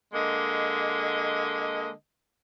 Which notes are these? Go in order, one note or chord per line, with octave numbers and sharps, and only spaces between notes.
D3 G#3 A#3 D#5